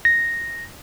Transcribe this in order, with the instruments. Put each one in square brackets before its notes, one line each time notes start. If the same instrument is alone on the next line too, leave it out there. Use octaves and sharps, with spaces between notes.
[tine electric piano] A#6